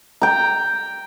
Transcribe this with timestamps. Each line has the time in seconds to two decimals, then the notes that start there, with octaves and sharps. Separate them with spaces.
0.22 G5 A#5